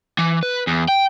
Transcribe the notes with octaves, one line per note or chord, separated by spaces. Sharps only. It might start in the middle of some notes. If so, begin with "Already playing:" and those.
E3
B4
E2
G5